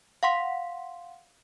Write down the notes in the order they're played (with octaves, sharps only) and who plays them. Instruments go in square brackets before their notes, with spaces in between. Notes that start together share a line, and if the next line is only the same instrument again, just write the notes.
[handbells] F5 F#5 C6 B6